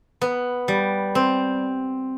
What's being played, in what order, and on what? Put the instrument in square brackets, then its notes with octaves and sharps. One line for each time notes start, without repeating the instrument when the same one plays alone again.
[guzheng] B3
G3
C4